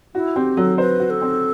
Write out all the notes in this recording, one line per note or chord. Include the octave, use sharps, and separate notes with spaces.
E4 F#4
C4 G4
F#3 A4
B4 C5
F#4
A4
C4